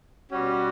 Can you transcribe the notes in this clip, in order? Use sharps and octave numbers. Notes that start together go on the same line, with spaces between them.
B2 G3 C#4 F#4